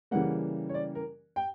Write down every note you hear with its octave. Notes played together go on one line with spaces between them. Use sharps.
C#3 E3 G3 A#3 F#5
C#5
D5
A#4
G5